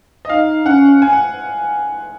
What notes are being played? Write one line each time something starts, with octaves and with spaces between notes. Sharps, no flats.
D#5
D#4 F5
C#4 F#5
G#5
F#5